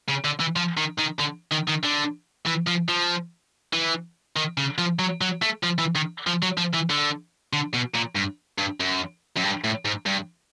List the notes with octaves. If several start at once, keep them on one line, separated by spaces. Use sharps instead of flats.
C#3
D3
E3
F3
D#3
D#3
D3
D#3
D#3
D3
E3
F3
F3
E3
D#3
C#3
F3
F#3
F#3
A3
F3
E3
D#3
F3
F#3
F3
E3
D3
D3
B2
A#2
G2
G2
F#2
F#2
G2
A2
G#2
G2